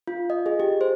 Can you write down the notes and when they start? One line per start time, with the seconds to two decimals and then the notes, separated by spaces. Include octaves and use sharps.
0.07 F4
0.30 D#5
0.46 G#4
0.60 G4
0.81 C5